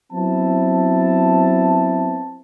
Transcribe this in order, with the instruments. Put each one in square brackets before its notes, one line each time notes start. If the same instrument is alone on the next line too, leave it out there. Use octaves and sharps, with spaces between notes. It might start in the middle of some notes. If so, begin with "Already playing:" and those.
[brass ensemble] F#3 B3 C4 E4 A5